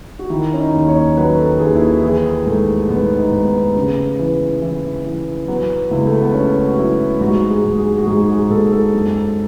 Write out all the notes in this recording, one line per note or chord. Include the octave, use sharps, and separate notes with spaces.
F#4
D#3 E4
C#4
D#4
D#2
C#5
F#3 B4
A4
D#2 G#4
E4
F#4
E3 G#4
G#2 A3
G#2 B3
D#4
G#2
B3
C#3
E3
E3
E3
F#3 B3
C#2 E4
A3
B3
C#3 C#4
F#4
F#3 E4
G#2 F#4
G#4
G#2
G#4
F#4
G#2 G#4
G#4
G#2 A4
A4
F#2